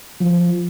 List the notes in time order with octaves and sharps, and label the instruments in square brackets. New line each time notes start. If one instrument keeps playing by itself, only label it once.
[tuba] F3